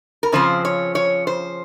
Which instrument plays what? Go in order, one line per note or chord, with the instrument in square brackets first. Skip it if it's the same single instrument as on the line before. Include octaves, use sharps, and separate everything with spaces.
[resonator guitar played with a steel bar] A#4
C#3 F3 C4 C5
C#5
C#5
C5